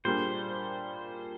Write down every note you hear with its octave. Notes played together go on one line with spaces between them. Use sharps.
A#2 G3 A#3 D4 G#4 C5